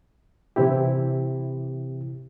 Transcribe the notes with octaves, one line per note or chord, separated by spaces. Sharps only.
C3 E3 C4 E4 G4